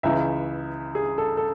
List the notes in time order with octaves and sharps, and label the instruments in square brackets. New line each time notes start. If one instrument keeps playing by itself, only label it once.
[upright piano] C#2 C#3 E3 E5
G#4
A4
A4